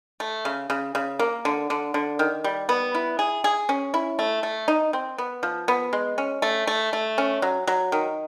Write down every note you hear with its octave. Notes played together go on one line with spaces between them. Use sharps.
A3
C#3
C#3
C#3
A#3
D3
D3
D3
D#3
G3
B3
E4
G#4
G#4
C#4
E4
A3
A3
D#4
C4
B3
F3
B3
G#3
C#4
A3
A3
A3
C#4
F#3
F#3
D#3